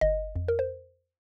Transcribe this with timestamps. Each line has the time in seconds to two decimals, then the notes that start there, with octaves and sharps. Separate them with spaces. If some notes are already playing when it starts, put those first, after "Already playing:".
0.01 G1 D#5
0.36 F2
0.48 A#4
0.59 C5